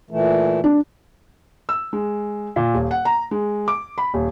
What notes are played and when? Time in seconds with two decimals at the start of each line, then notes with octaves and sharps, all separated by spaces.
0.11 A#2 E3 A3
0.64 D4
1.69 E6
1.93 G#3
2.56 A#2
2.74 D#1
2.91 F#5
3.05 A#5
3.31 G#3
3.68 D6
3.98 B5
4.14 D#1